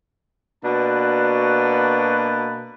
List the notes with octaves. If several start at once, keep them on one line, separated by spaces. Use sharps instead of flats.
B2 A#3 D4 F#4 B4 A5